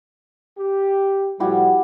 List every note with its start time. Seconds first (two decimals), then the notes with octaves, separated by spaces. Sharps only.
0.58 G4
1.40 A2 F3 G3 E4 F#4 G4